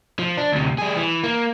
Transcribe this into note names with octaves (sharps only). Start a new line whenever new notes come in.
F3
D4
D2 C3
G3 G#4
E3
A#3